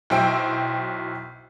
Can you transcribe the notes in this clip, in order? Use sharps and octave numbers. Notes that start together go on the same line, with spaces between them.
B1 F#3 E4 C5 G5 E6